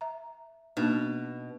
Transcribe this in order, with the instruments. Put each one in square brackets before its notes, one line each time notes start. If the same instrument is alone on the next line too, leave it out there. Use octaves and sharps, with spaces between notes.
[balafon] E5 A#5
[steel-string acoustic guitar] B2 [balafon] A#3 D4 D#4